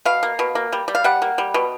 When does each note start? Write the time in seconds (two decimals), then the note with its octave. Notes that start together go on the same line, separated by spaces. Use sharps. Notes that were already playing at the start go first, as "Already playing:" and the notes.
0.05 B2 F5
0.23 A#3
0.39 B2
0.55 A#3
0.72 G3
0.88 G3
0.95 F5
1.04 G3 F#5
1.22 A#3
1.38 G3
1.54 B2